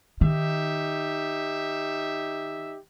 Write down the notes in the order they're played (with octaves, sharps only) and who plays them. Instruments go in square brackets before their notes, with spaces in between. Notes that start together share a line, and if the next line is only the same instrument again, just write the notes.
[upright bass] D#3 [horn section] D#4 G4 E5